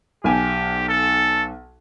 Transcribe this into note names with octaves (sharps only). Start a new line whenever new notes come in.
B1 G4 G#5
A4